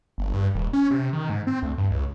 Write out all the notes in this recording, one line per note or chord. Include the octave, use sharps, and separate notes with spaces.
G1
G2
D#1
C#4
C3
D#3
G#2
C4
D2
G2
C#2